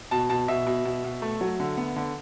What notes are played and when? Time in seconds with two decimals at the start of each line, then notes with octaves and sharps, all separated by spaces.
0.11 B2 A5
0.30 B2 A5
0.48 B2 E5
0.67 B2
0.85 B2
1.04 B2
1.22 A3
1.41 F#3
1.60 D3
1.77 B3
1.96 D3